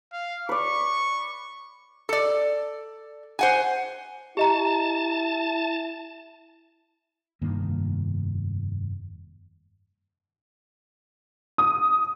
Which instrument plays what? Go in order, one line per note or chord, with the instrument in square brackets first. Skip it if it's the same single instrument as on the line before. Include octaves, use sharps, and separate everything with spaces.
[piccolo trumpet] F5
[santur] B4 D5 [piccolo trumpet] C#6
[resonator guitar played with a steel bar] A4 D5
C5 F#5 G#5
[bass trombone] E4 [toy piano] G4 D#5 A#5 [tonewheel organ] A5
[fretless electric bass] F1 G2 D#3 A#3
[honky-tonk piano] D#6